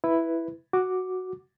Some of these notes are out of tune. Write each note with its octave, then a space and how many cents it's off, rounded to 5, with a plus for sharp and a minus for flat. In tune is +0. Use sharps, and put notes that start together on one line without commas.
E4 +0 B4 +0
F#4 +0 D6 +0